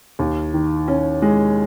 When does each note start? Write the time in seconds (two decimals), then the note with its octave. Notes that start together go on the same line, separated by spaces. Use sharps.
0.19 D#2
0.54 D#3
0.88 C#4
1.22 G#3